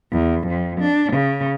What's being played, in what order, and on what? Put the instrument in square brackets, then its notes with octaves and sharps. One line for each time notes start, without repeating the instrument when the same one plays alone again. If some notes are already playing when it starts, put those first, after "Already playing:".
[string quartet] E2
F2
D4
C#3